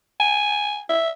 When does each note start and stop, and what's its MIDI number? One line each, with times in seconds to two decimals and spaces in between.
0.20 0.81 80
0.89 1.09 76